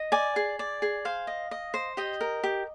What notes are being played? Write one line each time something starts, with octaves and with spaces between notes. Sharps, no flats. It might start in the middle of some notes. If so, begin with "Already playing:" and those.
Already playing: D#5
D5 G#5
G#4
D5
G#4
C5 F5
D#5
D#5
C5
G4 D#5
A#4
G4